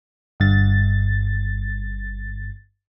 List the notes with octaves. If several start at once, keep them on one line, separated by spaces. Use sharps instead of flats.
G1 G2 A6